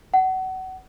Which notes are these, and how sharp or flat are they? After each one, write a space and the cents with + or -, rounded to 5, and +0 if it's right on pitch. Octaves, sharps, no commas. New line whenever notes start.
F#5 +25